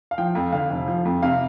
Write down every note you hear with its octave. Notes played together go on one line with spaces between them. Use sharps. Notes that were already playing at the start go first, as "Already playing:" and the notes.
F5
F3 G5
F2
D3 F5
F1
F3
F2
C3 F5